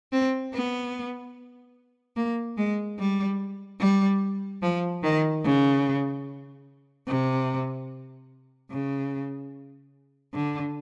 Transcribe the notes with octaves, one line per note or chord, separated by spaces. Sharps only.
C4
B3
A#3
G#3
G3
G3
F3
D#3
C#3
C3
C#3
D3